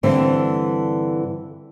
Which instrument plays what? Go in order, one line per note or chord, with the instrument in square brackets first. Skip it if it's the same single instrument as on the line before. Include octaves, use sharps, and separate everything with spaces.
[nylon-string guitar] G2 D3 E3 C4